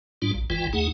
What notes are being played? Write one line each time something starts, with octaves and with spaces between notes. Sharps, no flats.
G#2 G3 D4 F4
A#1
G1 C#2 E3 F4 G5
D#2 A3 D#4 G#4 F#5